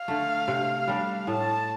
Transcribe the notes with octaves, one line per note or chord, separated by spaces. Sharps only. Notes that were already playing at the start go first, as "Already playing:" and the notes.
Already playing: F5
D3 A3
C3
G3 D4
A2 A5